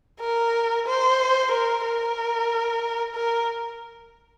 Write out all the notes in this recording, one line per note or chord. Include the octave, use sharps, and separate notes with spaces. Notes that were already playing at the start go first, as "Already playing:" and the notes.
A#4
C5
A#4
A#4
A#4